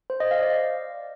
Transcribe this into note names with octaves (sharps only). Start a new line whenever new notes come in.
C5
D#5
F5
D5